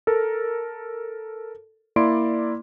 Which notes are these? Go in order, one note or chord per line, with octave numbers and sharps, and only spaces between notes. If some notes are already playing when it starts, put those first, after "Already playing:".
A4 A#4
A#3 E4 D5 C6 D7